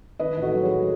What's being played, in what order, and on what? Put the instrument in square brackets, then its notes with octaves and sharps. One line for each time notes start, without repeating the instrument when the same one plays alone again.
[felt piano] D#3 B4 D#5
A1
F#4 A4
F#3
C#5
G#4 B4
F#3